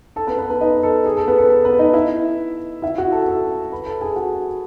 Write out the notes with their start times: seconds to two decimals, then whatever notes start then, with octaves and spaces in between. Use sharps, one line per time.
0.16 A4 A5
0.27 B3 B4
0.38 B3 B4
0.50 B3 B4
0.61 D#4 D#5
0.83 A4
1.06 G#4
1.17 A4
1.27 B3 B4
1.38 A4
1.49 A4
1.65 B3 B4
1.79 D#4 D#5
1.94 E4 E5
2.82 E4 E5
2.98 F#4 F#5
3.12 A4 A5
3.28 A4 A5
3.72 B4 B5
3.86 A4 A5
4.01 G#4 G#5
4.16 F#4 F#5